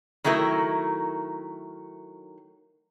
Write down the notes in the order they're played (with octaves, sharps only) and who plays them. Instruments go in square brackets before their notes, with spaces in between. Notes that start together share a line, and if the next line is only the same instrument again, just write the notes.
[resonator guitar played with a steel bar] D#3 F#3 A3 E4 A#4